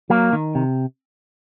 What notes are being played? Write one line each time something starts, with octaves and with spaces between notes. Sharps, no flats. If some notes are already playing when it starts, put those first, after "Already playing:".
F#3 A#3
D#3
C3